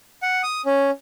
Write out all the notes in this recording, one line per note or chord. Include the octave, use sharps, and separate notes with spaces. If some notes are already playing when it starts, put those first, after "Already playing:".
F#5
D#6
C#4